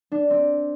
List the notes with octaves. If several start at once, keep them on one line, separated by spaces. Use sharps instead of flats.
D4
C4